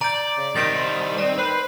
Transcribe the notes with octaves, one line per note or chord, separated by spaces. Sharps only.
D5 A#5 G6
C#3
D#3 G3 C5 A6 A#6 D7
C4 D5
B4 C5